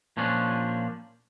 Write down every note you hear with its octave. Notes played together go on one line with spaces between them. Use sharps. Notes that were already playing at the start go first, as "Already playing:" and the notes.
A#2 F3 C#4 D4